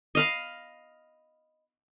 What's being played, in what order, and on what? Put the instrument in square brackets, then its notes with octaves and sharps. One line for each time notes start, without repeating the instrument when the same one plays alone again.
[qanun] D#5 F5 B5